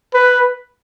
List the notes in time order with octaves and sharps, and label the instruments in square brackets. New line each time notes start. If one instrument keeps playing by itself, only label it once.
[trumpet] B4